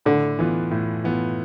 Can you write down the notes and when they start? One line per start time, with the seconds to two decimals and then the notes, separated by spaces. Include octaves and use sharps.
0.06 A2 D3
0.39 E3 B3 F4
0.71 A2
1.04 E3 B3 F4